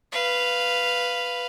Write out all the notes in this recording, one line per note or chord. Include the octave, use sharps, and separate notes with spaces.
B4 F5